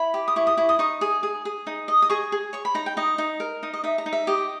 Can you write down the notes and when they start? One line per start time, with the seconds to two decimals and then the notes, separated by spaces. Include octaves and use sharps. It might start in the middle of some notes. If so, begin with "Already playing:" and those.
Already playing: E4 B5
0.14 G4
0.28 D#6
0.36 E4 C#6
0.47 D#6
0.57 E4 C#6
0.69 D#6
0.79 D#4 C#6
1.01 G#4
1.23 G#4
1.45 G#4
1.67 D#4
1.88 D#5
2.02 D#6
2.10 G#4 C#6
2.32 G#4
2.53 C#5 C#6
2.65 B5
2.75 D#4 A#5
2.86 G5
2.97 D#4 D#5
3.18 D#4
3.40 A#4
3.63 D#4
3.74 D#5
3.84 D#4 E5
3.98 A#5
4.06 D#4
4.13 E5
4.27 G4 D#5